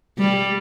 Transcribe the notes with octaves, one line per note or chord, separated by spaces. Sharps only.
G3